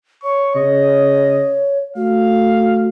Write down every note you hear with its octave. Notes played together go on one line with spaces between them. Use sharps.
C#5 C#6
C#3 D#5
A3 F#4 F5